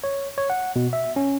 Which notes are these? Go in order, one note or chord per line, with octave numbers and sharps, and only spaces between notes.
C#5
C#5
F#5
B2
E5
C#4